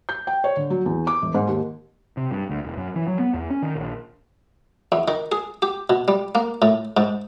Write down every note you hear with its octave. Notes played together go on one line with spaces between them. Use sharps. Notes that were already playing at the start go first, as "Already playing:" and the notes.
G6
G5
C#5
D3
F#3
E2
D6
E1
G#2
D#2
C3
G2
D2
E1
F#2
E3
F#3
B3
E2
C#4
D#3
A#1
E2
D#3
G#4
G4
B2
G3
A#3
A2
G#2